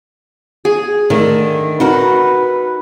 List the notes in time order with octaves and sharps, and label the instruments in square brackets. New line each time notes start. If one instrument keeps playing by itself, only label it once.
[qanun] G#4
[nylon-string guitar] D3 D#3 A3
[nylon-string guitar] D#4 F#4 A#4 [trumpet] B4